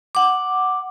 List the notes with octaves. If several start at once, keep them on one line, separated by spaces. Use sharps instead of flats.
F#5 D6